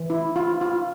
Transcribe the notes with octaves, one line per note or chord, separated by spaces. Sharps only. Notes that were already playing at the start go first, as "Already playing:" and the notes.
Already playing: E3
E4
F4
F4